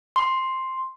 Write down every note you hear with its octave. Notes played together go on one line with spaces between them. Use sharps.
C6